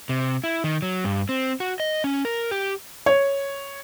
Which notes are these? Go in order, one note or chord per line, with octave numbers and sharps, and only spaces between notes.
C3
E4
D#3
F#3
G2
C4
F#4
D#5
C#4
A#4
G4
C#5